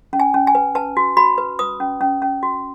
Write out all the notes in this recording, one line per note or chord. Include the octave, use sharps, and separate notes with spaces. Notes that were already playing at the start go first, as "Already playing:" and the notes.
C#4
G#5
C#4
G#5
B4
B4 A5
F#4
F#4 B5
B4
B4 D#6
C#4
C#4
C#4
F#4